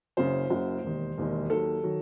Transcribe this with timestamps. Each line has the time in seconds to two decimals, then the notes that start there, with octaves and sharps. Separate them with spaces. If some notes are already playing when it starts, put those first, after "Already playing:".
0.17 F#1 F#2 C#3 C5
0.50 F#1 F#2 C#3
0.83 E1 D#2 D#3
1.18 E1 D#2 D#3
1.50 D#2 D#3 F#3 A4
1.83 D#3 F#3